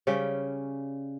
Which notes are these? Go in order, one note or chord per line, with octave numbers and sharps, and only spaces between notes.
C#3 G3 C#4 G5